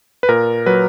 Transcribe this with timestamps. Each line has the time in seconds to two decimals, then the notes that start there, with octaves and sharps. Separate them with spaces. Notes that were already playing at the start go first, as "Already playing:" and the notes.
0.23 B4
0.29 A#2 A#4
0.66 F#3 B4